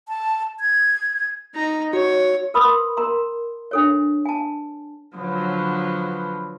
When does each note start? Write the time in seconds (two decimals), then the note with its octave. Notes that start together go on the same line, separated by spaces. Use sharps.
0.08 A5
0.60 G#6
1.55 D#4 A#5
1.93 F#4 C#5
2.54 A#4 B4 B5 C6 D#6
2.97 A#4 A#5 C6
3.71 D4 A4 C#5
4.25 G#5 A5
5.17 D3 F3 F#3 B4